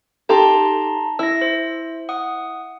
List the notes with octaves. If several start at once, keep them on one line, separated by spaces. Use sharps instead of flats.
D#4 G4 A4 A5 A#5 C6
E4 E6 A#6
C5
F#5 D#6